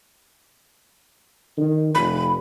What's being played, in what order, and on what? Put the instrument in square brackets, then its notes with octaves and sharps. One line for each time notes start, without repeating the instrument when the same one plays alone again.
[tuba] D#3
[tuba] F1 [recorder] B5